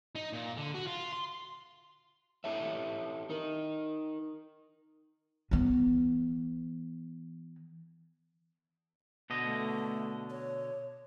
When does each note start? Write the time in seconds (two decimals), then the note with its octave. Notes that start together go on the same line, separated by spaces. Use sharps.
0.16 D#4
0.33 A#2
0.57 D3
0.75 F#4
0.87 F4
1.12 C6
2.44 E4 G4 A4 C#5 E5
3.30 D#4 A#4
5.51 E3 B3
9.30 B2 D3 D#5
9.45 A3
10.31 C#5